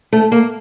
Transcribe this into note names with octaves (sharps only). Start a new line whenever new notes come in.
A3
A#3